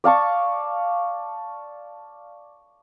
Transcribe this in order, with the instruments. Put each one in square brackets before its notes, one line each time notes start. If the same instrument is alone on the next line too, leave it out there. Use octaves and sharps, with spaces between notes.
[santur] D5 F5 A5 C#6